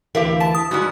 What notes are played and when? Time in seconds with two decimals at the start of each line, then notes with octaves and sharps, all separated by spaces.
0.15 D2 E3 G4 A#4 E5 F5
0.40 A5 B6
0.55 D#6
0.71 G#2 E3 G3 F#4